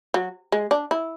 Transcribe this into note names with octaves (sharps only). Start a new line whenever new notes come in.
F#3
G#3
D4
E4